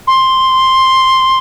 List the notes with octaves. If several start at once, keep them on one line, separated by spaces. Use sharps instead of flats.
C6